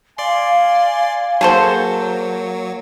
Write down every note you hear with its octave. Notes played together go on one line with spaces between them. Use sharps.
D5 F5 G#5 C6
F#3 A#3 G#4 A4 C5